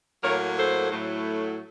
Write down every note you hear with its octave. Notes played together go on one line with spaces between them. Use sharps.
A2 F#3 A#3 A#4 C#5
A4 C5
A2 F#3 A3